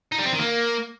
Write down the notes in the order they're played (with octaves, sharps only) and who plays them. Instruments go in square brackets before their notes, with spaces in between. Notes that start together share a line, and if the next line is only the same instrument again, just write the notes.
[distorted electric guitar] D#4
G3
C4
D#3
A#3